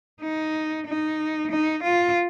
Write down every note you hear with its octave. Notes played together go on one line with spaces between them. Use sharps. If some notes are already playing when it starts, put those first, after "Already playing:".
D#4
D#4
D#4
F4